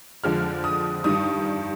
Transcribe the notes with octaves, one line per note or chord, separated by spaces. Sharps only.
F2 D3 F3 G#3 F6
D#6
G2 D#3 G3 D#6